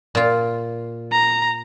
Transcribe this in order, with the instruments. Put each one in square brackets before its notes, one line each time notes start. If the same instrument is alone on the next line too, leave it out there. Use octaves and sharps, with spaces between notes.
[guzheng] A#2 F4
[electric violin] A#5